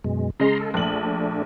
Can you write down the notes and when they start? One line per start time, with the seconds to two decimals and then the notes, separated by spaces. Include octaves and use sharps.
0.04 F#2 B2 G#3
0.40 C#3 G#3 A#5 C6
0.60 A4
0.74 A#1 A3 D4 F#7